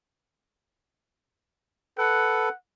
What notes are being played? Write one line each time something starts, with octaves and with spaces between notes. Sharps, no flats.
A4 B4 F#5